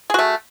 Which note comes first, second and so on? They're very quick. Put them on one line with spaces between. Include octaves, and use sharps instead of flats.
G#4 F#4 A3